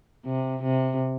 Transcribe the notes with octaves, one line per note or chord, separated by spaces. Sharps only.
C3
C3